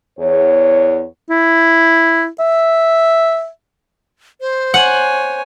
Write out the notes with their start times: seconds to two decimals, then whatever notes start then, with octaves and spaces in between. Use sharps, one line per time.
0.19 E2 C#5
1.31 E4
2.40 E5
4.41 C5
4.74 C#5 F#5 G#5